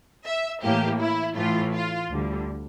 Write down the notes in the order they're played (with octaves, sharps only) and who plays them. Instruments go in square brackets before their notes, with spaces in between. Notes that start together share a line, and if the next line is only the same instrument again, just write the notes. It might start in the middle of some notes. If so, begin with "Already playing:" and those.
[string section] E5
A2 E3 A#3 G4
E4
A2 E3 A3 F4
F4
D2 D3 G3